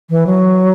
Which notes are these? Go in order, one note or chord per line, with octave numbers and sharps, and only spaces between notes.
E3
F#3